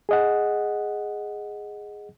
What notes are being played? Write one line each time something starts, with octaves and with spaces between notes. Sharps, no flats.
G#4 D#5 F#5